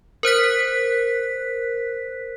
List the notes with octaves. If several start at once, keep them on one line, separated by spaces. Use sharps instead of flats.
A#4 C5 F#6 B6